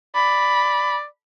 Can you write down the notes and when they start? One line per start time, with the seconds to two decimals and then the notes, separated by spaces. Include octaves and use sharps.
0.15 D5 B5